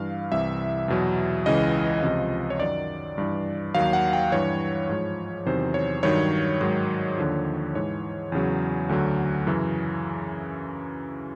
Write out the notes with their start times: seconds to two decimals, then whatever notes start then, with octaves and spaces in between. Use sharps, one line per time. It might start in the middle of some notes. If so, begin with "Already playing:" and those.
Already playing: G2 E3 F5
0.32 C2 C3 E3 E5
0.88 E2 B2 F#3
1.46 C#2 C#3 E3 D#5
2.02 C#2 C3 F3
2.50 C#5
2.60 F#2 D#3 F#3 D5
3.18 G2 E3
3.74 D#2 D#3 F#3 F5
3.93 F#5
4.13 G5
4.32 G2 E3 C#5
4.89 G#2 F3
5.46 E2 C3 D#3 F#3 C5
5.74 C#5
6.03 G2 D#3 F#3 C#5
6.61 G#2 D#3 F#3
7.18 D#2 D3 F3
7.75 G#2 E3 C#5
8.32 E2 C#3 F#3
8.89 D2 D3 F#3
9.47 F#2 C#3 E3